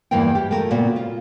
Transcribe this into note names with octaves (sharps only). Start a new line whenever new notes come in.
E2 G2 E3 A#3 A#4 G5
G4
A3 F4 A#4
A#2 C#3 B3 F#4
F4